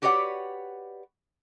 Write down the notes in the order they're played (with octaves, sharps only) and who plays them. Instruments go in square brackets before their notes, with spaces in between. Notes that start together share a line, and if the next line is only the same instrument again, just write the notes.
[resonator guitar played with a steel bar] F#4 G4 B4 C#5 D5 F#5